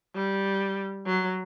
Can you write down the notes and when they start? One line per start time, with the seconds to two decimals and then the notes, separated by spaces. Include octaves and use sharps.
0.15 G3
1.06 F#3